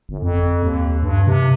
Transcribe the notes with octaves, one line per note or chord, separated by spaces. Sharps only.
G1
F2
D#2
G2
C3